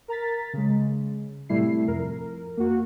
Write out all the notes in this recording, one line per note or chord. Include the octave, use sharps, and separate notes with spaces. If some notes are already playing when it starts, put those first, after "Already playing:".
A#4 A#5 A6 B6
C#3 G#3
A2 C3 G3 A3 E4 C7
F2 A#4
A#3 F#4